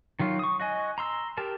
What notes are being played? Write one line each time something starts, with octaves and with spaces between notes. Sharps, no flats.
D#3 F#3 F4
C#6 D#6
F#4 D#5 G#5
A#5 C6 E6
G4 A#4 A5